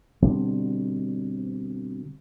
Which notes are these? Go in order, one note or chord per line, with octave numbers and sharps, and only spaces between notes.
B2 D3 G3 C4